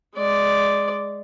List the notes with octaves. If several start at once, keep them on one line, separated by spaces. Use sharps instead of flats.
G#3 D5